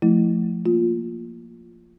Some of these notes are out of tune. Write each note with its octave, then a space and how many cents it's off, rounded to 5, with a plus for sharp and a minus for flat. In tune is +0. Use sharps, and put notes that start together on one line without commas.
F3 +0 A3 +0 E4 +0
A#3 +0 F4 +0